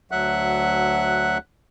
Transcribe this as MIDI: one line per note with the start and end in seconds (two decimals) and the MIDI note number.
0.11 1.38 38
0.11 1.38 54
0.11 1.38 76
0.11 1.38 78
0.11 1.38 90